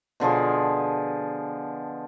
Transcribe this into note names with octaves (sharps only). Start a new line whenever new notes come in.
B2 D3 F3 G#4